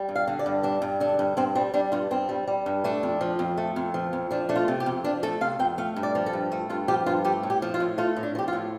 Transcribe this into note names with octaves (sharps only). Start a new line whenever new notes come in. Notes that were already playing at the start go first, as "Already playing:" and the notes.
Already playing: G3
G2
F5
D3
D5
G2
G3 D4
G2
D3 D4
G2
G2 C4
G3 C4
G3 D4
G2 F4
G2 C4
G3
G3
G2
A3 D4
F2
F3
F2
A3
F2
F3
F2
F3 D4
A3 D4
F4
C3
G4
F2
F3 D4
A3 A4
C3 F5
F2 G5
A3 F5
G2
D5
F3
A4
G2
A3
G2 F4
F3 G4
G2 F4
A3 G4
A2
G4
F3
F4
A2
A3 F4
A2
D4
F3 G4
F4
A2